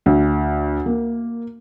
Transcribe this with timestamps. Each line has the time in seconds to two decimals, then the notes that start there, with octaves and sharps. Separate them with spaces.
0.06 D2
0.86 A#3